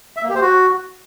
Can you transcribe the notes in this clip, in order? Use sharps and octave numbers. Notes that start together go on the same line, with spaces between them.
E5
A#3
G4
C5
F#4